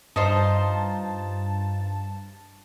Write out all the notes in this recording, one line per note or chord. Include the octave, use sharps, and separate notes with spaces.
G2 D#4 F4 C5 A5